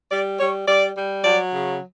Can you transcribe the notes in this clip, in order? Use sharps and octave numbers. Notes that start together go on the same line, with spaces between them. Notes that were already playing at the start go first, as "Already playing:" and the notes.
G3 D5
G3 C#5
G3 D5
G3
F#3 D5
C#3